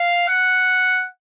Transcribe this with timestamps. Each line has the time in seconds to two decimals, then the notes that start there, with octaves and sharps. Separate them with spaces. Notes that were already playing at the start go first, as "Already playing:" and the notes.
Already playing: F5
0.28 F#5